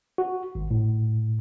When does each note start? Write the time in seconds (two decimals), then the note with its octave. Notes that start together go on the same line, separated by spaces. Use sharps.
0.18 F#4
0.55 G#1
0.71 A2